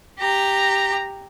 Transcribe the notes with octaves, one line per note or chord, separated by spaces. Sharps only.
G4 A#5